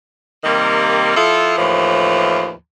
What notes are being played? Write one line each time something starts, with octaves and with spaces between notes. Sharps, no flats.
C3 D#3 G3 A#3
F3 E4 F4 A4
D#2 A2 E3 F3